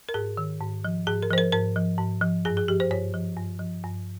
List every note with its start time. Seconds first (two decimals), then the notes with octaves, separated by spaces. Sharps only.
0.09 A#4
0.14 G#2 G#4
0.37 D#3
0.61 G#2
0.85 F3
1.07 G#2 G#4
1.23 A#4
1.30 F3 C5
1.38 A#4
1.52 G#2 A#4
1.76 F3
1.98 G#2
2.22 F3
2.45 G2 G#4
2.57 G#4
2.68 F3 G4
2.80 C5
2.91 G2 C#5
3.14 F3
3.37 G2
3.60 F3
3.83 G2